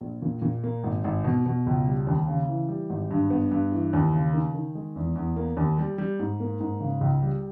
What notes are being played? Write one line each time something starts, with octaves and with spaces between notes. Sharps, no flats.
A#1
A#2
A#2
A#3
G#1
G#1
B2
B2
C#2
G3
D#2
C#3
E3
G3
G#1
G2
B3
G2
E3
D#2
C#3
D#3
D#3
G#3
E2
E2
A#3
D#2
G3
G3
G#2
A#3
G#2
C#3
C#2
G3